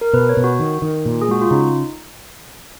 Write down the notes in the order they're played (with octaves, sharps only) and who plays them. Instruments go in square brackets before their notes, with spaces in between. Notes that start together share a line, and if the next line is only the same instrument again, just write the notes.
[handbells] A#4
[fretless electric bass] B2 [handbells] B4
[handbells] C#5
[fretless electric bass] B2
[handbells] F#4
[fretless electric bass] D#3
D#3
A#2
[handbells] G#4
[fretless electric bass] G#3 [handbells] F#4
[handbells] F4
[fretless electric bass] C#3 [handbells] D#4